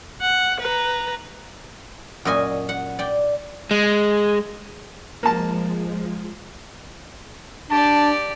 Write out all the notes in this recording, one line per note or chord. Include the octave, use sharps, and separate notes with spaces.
F#5
B4 A#5
F#2 A#2 D#5 G#5
F#5
D5 G5
G#3
F3 G#3 A#3 A5
D4 G4 D5 A5